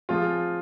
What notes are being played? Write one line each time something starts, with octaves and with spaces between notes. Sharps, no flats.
F3 C4 F4 G#4